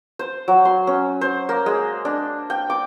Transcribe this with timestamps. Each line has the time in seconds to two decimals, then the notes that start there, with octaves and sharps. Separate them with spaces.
0.19 C5
0.48 F#3
0.65 C6
0.87 C#4
1.21 C5
1.49 A#3
1.66 G#3
2.05 D4
2.50 G5
2.70 D6